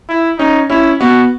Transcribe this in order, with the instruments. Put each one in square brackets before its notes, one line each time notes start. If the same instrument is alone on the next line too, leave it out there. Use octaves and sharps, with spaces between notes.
[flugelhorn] E4
[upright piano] C#4 [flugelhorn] D#4
[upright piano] C#4 [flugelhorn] E4
[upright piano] B3 [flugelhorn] F#4